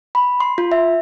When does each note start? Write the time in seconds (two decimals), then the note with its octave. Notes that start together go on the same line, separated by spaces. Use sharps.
0.15 B5
0.40 C6
0.58 F4
0.72 E5